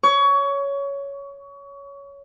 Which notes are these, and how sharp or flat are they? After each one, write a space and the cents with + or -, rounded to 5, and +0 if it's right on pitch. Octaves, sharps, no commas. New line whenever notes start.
C#5 +10 C#6 +25